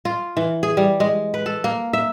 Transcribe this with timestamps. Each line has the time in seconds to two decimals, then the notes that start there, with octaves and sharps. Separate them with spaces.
0.05 F4
0.37 E3
0.63 G#4
0.77 G3
1.00 G#3
1.34 B4
1.46 A4
1.64 A#3
1.93 E5